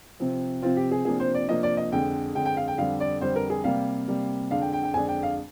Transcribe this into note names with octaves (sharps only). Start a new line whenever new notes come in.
C3 F3 C4
C3 F3 C4 F4
G4
G#4
C3 F3 A#3 D4 G#4
C5
D5
C3 F3 A#3 D4 D#5
D5
D#5
F2 D3 G#3 G5
F2 D3 G#3 G5
G5
F5
G5
F2 D3 G3 F5
D5
F2 D3 G3 C5
A#4
G#4
C3 G3 A#3 F5
C3 G3 A#3
F2 D3 G#3 D4 F5
G5
G5
G5
F2 D3 G#3 D4 G#5
G5
F5